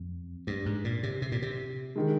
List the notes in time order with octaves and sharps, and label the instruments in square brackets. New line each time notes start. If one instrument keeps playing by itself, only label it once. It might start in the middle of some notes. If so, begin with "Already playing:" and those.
Already playing: [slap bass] F2
G2
G#2
A#2
C3
C3
A#2
C3
[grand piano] D#3 G#3